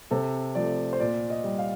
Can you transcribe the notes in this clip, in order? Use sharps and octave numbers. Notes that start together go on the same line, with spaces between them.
C3 A4
F3 A3 D5
C5
A#2 D5
D#5
G3
F5